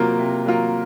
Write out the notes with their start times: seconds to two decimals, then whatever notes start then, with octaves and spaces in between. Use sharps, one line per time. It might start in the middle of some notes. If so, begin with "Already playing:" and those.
Already playing: C3 F#3 A#3 F4 A#4
0.19 C3
0.46 F#3 A#3 F4 A#4